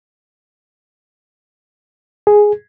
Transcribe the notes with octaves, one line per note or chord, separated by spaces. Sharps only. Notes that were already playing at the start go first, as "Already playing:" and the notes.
G#4